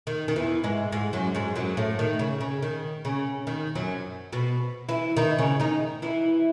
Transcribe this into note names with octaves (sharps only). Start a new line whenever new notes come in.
D#3
D#3
E2 E3
G#2 G#3
G#2 G#3
F#2 F#3
G#2 G#3
F#2 F#3
A2 A3
D#3
C#3
C#3
D#3
C#3
D#3
F#2 F#3
B2 B3
E3 E4
D#3 D#4
C#3 C#4
D#3 D#4
E3 E4